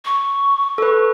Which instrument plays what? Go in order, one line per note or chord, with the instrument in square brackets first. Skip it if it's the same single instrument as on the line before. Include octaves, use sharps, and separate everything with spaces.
[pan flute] C#6
[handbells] A4 B4